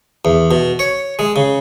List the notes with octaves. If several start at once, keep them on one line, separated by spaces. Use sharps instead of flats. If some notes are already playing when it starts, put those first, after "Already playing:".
E2
B2
C#5
G#3
C#3